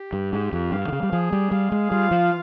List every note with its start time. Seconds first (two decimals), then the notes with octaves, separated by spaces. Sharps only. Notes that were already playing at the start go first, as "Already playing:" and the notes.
Already playing: G4
0.13 G2
0.33 G#2 G4
0.53 F2
0.72 G2 F5
0.88 D#3
0.92 C#3
1.03 G3
1.12 F3 G#4
1.32 G3
1.51 G3 F5
1.72 G#3
1.91 G3 F4
2.11 F3